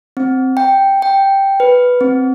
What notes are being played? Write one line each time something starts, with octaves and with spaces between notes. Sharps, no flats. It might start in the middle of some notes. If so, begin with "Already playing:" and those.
C4
G5
G5
B4
C4